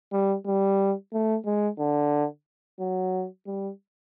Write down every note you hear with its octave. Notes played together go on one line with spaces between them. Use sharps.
G3
G3
A3
G#3
D3
F#3
G3